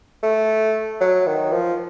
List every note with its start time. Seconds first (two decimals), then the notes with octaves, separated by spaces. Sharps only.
0.23 A3
1.01 F#3
1.27 D#3
1.52 F3